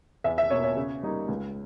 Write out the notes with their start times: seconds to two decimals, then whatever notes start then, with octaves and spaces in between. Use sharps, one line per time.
0.24 E2 E5
0.38 E5
0.51 B2 A#3 C#5
0.64 C#5
0.77 C#3
1.03 G3 A#3 D#4
1.28 C#2